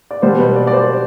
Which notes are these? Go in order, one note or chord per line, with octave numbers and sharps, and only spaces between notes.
D5
B2 G3 C5
B4
D5
D5
C5